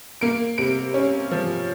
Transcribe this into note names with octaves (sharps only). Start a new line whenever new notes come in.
A#3 D7
C3 D7
C#4
F3